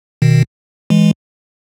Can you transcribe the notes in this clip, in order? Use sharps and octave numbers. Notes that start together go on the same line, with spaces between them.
B2 D#3
E3 G#3